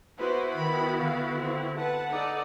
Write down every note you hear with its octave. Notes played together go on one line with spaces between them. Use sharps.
B3 E4 F#4 B4 C5
D#3 B5
D3 F5
C4
B4 F#5 A5
D#4 A4 D5